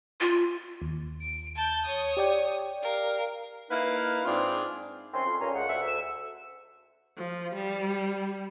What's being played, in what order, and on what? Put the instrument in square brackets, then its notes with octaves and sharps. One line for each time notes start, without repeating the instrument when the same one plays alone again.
[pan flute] F4
[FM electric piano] D#2
[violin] D7
A5 G6
C#5 D#6
[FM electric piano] G4 D5 G5
[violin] A#4 F5
[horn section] A#3 D#4 E4 B4 F5
G#2 C4 D4 F4 G#4
[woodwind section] F#2 C4 C#4 [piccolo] C6
[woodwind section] F2
[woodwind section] G2 A#2 C#4 [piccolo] A#5
[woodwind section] C#2 [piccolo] F#5
[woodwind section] D2 E5
[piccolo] E7
[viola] F3
G3